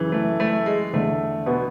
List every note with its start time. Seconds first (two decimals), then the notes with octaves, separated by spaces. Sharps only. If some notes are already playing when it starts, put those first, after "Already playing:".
Already playing: F#2 C#3 E3
0.12 A3
0.40 A3
0.66 G#3
0.93 E2 D3 A3
1.46 B2 B3